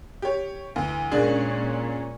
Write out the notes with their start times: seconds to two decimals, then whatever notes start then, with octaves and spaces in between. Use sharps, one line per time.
0.22 G4 C#5
0.76 D2 E3
1.11 A#2 G#3 A#3 C#4 D4 G#4